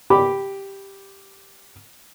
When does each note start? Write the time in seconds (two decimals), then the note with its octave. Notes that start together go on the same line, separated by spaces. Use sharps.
0.10 G4 B5 D6